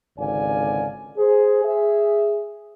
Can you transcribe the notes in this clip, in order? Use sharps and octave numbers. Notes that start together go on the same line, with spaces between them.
G#1 C#2 D3 D5 F5 G#5
G#4 C5
G#4 E5